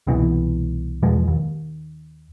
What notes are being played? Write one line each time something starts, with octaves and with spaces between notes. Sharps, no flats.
C2 B2 E3
E2 B2 F3 G#3
D#2